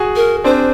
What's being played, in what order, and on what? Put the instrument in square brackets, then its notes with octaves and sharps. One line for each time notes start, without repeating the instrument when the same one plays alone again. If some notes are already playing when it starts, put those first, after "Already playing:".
Already playing: [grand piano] F#4 G#4
[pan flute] A#4
[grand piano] C4 D4 [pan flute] C5